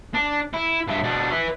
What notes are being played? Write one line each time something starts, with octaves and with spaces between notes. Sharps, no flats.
D4
E4
G2 E5
B2 D4
B4 E5